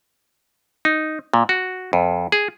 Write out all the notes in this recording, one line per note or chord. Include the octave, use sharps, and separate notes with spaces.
D#4
A#2
F#4
F2
G#4